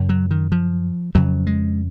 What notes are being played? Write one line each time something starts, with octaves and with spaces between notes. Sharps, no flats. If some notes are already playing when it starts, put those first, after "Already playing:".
Already playing: F#2 C#3
F#3
D#3
F3
F2 C#3 F#3
G#3